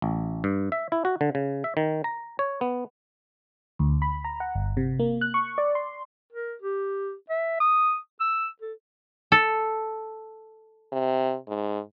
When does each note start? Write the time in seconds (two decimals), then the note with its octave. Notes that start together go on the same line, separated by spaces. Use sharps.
0.02 A1
0.44 G2
0.72 E5
0.92 E4
1.05 F#4
1.21 D3
1.35 C#3
1.64 E5
1.77 D#3
2.04 A#5
2.39 C#5
2.61 B3
3.79 D2
4.02 B5
4.24 A#5
4.40 F#5
4.55 G1
4.77 C3
4.99 A#3
5.21 F#6
5.34 C#6
5.58 D5
5.75 C6
6.33 A#4
6.62 G4
7.30 E5
7.60 D#6
8.20 E6
8.61 A4
9.32 A4
10.92 C3
11.48 G#2